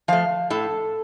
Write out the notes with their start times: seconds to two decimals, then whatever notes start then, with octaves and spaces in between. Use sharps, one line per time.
0.08 F3 A3 F5
0.50 A2 A4